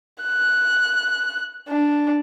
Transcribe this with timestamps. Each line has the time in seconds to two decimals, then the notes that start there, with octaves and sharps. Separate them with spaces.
0.23 F#6
1.69 D4